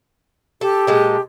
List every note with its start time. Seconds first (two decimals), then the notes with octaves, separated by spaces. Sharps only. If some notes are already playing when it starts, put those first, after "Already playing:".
0.61 G4 A4
0.87 A#2 G#3 A4